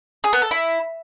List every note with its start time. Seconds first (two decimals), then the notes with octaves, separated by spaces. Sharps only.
0.24 G#4
0.33 B3
0.42 A4
0.51 E4